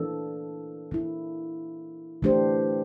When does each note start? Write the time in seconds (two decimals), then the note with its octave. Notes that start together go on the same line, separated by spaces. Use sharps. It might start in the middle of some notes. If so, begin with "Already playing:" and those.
Already playing: E3 A#3 D4 A4
0.91 E3 A#3 E4
2.22 E3 A3 D4 G4 C5